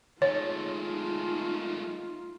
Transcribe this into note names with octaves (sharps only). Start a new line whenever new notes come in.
G#3 A3 D#4 F4 C#5